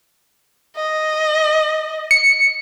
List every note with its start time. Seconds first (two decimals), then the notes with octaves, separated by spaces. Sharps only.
0.77 D#5
2.11 C#7